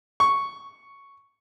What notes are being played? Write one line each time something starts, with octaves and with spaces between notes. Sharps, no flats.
C#6